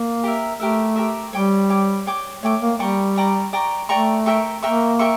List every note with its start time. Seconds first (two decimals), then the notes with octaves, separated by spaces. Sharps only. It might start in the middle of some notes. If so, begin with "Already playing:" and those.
Already playing: A#3
0.23 G4 A#4 E5
0.60 A3 G4 A#4 E5
0.96 G4 A#4 E5
1.33 G3 C#5 G5 D6
1.69 C#5 G5 D6
2.07 C#5 G5 D6
2.43 A3 C#5 G5 D6
2.61 A#3
2.79 G3 D5 G5 A#5 C#6
3.16 D5 G5 A#5 C#6
3.53 D5 G5 A#5 C#6
3.89 A3 D5 G5 A#5 C#6
4.26 A#4 E5 G5 C#6
4.63 A#3 A#4 E5 G5 C#6
4.99 A#4 E5 G5 C#6